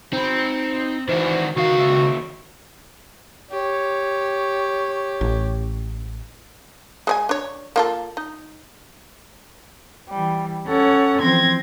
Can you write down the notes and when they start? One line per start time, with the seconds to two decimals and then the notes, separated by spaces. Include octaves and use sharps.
0.13 C4 D#4 B5
1.09 D#3 E3 F#4 C5
1.57 C#2 D#3 F#4 F5
1.79 D#2 E5
3.51 G4 C#5
5.21 A1
7.07 G#3 D5 G#5
7.29 D4 C#5
7.76 A#3 F4 A4
8.17 D#4
10.10 E3 G3
10.68 C#4 A4 C#5 F#5
11.22 E3 F3 C4 C6 G#6 A#6